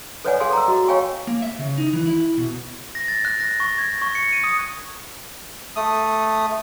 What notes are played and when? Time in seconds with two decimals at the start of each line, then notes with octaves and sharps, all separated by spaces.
0.25 A4 B4 C#5 D5 F#5 G#5
0.40 G#4 A4 F5 G#5 C6
0.53 A#5 E6
0.68 F#4 D#5
0.88 C#5 F5 G5 G#5 C#6
1.27 A#3
1.42 E5
1.59 C#3
1.78 D#4
1.93 E3
2.06 E4
2.19 E4
2.38 B2
2.95 A#6
3.08 A6
3.25 F#6
3.40 A#6
3.60 C#6
3.78 G#6
4.02 C#6
4.15 C#7
4.33 D#7
4.44 D#6
5.76 A3 D#6